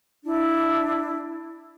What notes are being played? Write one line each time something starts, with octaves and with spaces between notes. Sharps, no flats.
D4 E4